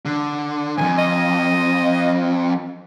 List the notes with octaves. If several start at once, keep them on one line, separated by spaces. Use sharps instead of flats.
D3
F2 G#2 G#5
D#5